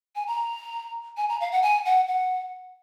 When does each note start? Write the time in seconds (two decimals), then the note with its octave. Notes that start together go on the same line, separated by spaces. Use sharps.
0.16 G#5
0.27 A#5
1.17 G#5
1.29 A#5
1.41 F5
1.52 F#5
1.63 G#5
1.85 F#5
2.08 F#5